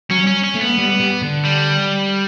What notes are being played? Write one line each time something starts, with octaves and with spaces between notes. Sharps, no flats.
F#3 C#4
C#4
C#4
A3
B3
G3
G3
D3
G3